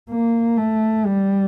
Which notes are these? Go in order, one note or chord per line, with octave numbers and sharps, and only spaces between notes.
A#3
A3
G3